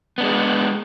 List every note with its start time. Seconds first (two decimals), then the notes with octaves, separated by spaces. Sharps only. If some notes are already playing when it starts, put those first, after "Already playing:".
0.18 B3
0.21 D4
0.23 G#3